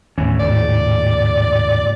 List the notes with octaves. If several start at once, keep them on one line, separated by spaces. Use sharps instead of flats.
D#2 A2 E3 C#4
G#2 C#3 A3 D5